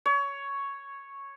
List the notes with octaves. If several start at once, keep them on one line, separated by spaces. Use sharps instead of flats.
C#5